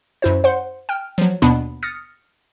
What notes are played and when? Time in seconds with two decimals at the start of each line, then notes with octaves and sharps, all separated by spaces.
0.22 F#2 E4 C5
0.44 C5 F#5 C6
0.89 G5 F6
1.18 F3 F#3
1.42 D#2 B2 B3 D4 B5
1.83 D#6 F6 A6 A#6 C#7